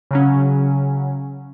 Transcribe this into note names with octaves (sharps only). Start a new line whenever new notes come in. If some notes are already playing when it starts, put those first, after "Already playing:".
C#3 F#3 C#4